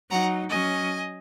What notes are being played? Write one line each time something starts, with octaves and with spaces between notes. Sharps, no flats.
F#3 D#4 F#5 A#5
F#3 C#4 D#5 G#5